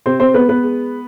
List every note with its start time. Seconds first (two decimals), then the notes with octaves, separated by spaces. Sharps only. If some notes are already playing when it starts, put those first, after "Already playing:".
0.06 C3 C4 C5
0.20 C4 C5
0.34 G#3 B3 B4
0.49 B3 B4
0.63 G#3